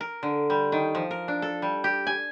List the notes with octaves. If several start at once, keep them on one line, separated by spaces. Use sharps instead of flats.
A#4
D3
G3
D#3
F3
A#4
D4
A4
G3
G4
G#5